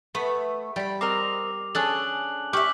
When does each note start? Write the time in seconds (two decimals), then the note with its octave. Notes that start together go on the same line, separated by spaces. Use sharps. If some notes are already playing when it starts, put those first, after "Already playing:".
0.15 A3 B3
0.76 G3 G5 B5
1.01 C4 A#4 D#5 D6 F7
1.75 C#4 D4 G#4 A4 G#5 F#6 F#7
2.53 G4 E5 C#6 D6 F6 F#7